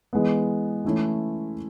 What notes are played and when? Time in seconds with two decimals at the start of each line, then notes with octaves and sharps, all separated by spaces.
0.13 E3 G#3 B3
0.85 E3 A3 C#4 E4